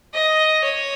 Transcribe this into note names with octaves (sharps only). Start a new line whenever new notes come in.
D#5
C#5